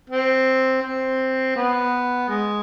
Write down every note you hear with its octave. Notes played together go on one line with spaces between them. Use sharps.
C4
C4
B3
G#3